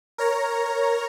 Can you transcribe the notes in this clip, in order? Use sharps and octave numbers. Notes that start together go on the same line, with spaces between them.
A#4 C#5 A#5